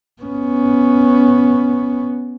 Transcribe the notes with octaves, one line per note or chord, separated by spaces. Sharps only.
B3 C#4